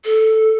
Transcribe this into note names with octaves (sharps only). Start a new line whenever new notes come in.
A4